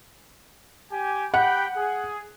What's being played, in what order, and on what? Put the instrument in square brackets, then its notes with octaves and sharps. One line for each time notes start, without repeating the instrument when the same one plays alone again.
[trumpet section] G4 G#5
[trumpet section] G4 G5 B5 [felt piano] F#5
[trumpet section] G#4